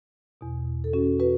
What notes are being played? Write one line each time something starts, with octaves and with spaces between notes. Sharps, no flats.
E2 B2
A4
C#4 F#4
F#4 B4